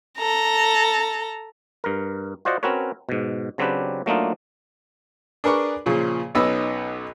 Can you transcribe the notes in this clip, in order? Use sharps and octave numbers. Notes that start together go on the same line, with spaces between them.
A4 A#5
G2 A#4
F4 F#4 C5 D5 D#5 F#5
C4 C#4 F#4 A#4 B4 C#5
G#2 B2
C#3 F#3 C4 D4 G4 B4
F#3 A3 A#3 D4 D#4 F4
D4 G#4 A#4 B4 D5 C#6
A#2 C#3 F3
B1 B3 C#4 D#4 B5 E6